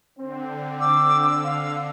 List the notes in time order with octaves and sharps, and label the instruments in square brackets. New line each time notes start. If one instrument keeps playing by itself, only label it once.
[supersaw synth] D3 [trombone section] C4
[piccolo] D6 [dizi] E6
[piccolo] F5